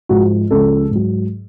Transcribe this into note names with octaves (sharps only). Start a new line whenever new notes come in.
G#2 F3 F#4
C#2 C#3 F3 A4
G#2 F#3